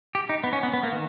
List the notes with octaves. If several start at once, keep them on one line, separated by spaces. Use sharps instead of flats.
G4
D#4
B3
C#4
B3
B3
A#3
D#3